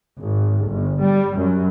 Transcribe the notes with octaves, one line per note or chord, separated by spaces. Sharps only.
G#1
G1
G3
F#2